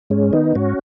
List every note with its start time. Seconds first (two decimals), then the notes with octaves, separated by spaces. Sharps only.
0.10 G#2 G#3 C#4
0.33 D#3 B3 D#4
0.56 G#2 C#4 F#4